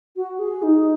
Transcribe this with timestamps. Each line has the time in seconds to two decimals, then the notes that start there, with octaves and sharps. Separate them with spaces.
0.16 F#4
0.39 G#4
0.62 D#4